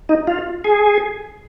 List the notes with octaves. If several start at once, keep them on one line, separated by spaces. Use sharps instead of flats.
D#4
F4
G#4